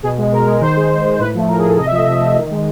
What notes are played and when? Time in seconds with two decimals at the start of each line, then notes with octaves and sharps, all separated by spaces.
0.03 B2 G#4
0.18 G#3
0.32 B2 A#4
0.46 G#3
0.61 D#3 C5
0.76 G#3
0.90 D#3
1.04 G#3
1.19 A2 B4
1.35 F3 A3
1.48 A2 A#4
1.58 G#4
1.63 F3 A3 A4
1.77 C3 D#5
1.87 E5
1.92 F3 D#5
1.97 A3
2.06 C3 E5
2.21 F3 A3
2.36 D#3
2.51 G#3